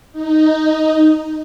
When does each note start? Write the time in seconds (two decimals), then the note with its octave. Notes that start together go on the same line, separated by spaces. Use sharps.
0.13 D#4